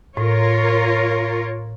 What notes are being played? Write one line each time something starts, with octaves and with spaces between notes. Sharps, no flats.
A2 F4 A#4 C#5